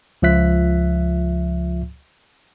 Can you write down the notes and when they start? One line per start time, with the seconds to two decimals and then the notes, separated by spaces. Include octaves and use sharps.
0.22 C#2 F3 F4 E5 F#6 B6